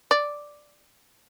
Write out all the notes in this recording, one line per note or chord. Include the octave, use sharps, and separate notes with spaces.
D5